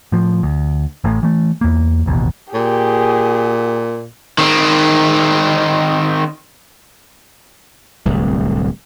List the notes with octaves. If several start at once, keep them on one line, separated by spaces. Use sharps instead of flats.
A2 F3
D2
A1 A2
E3 A3
E2 A#3
E1 A1 D#2 B2
A#2 G4 G#4
D#3 C4
D1 C2